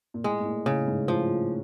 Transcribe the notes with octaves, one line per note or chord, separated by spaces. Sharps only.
A#2
A2 G#3
A2
A#2
A2 C#3
G#2
A2 F3